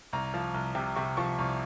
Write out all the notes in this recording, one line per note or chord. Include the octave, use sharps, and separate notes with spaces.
C2 A#5
F3
C2
C3
C3 C#6
F3 C#6
C2